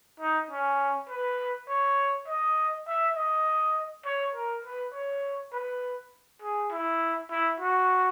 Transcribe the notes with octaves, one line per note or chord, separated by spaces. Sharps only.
D#4
C#4
B4
C#5
D#5
E5
D#5
C#5
A#4
B4
C#5
B4
G#4
E4
E4
F#4